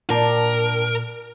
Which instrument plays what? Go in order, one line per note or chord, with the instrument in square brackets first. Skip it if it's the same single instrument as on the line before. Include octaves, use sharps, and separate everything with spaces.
[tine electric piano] A#2 [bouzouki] D4 G5 A5 [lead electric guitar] A#4